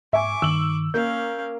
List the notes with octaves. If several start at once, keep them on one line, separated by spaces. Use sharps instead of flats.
G#2 E5 G#5 C#6 D6
G2 D#3 E6 F#7
A#3 C#4 F5 G6